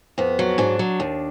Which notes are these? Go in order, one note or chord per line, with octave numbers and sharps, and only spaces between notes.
F2 B3
F#3
G#2 D4
F#3
D#2